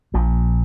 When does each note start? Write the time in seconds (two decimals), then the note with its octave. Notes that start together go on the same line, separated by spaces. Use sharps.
0.14 A#1 A#2 F3